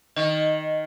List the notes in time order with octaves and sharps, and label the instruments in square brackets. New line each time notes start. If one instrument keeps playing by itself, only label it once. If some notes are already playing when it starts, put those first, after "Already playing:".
[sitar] D#3 [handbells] D#5